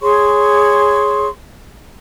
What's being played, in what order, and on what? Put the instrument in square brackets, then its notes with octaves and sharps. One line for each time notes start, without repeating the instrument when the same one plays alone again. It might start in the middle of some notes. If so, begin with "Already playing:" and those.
[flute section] G#4 C#5 C6 C#6